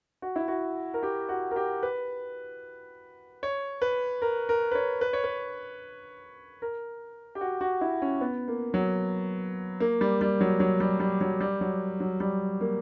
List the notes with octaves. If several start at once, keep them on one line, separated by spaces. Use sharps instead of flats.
F#4
E4
F#4
A#4
G4
F#4
A#4
G4
B4
C#5
B4
A#4
A#4
B4
C#5
B4
C#5
B4
A#4
G4
F#4
F#4
E4
C#4
B3
A#3
F#3
A#3
G3
G3
F#3
F#3
G3
G3
F#3
G3
F#3
F#3
G3
A#3